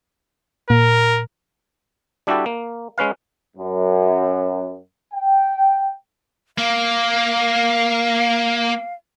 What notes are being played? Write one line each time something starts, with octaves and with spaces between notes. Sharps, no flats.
A#2 A#4
G3 D4 E4 F#4 G4 A4
A#3
G#3 C#4 B4 F5
F#2
G5
A#3 F5